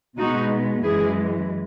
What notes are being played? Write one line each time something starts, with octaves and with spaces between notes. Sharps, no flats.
B2 G#3 B3 D#4 F#4
F#2 E3 G#3 E4 G#4